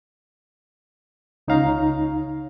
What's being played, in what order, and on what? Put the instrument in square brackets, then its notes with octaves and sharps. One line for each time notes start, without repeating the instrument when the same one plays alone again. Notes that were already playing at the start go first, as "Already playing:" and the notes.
[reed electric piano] C#2 D#4 C#5 F5 A#5